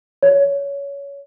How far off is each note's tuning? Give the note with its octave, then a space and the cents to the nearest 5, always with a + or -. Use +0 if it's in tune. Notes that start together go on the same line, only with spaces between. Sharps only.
C#5 +20